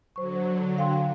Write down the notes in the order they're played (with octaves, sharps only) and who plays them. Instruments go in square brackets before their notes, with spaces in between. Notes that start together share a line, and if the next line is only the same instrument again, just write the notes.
[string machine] D3 F#3 [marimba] C5 C#6
[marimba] F5 G5 C6